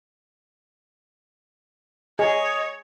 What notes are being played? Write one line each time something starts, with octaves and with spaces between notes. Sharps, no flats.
G#4 C#5 D#5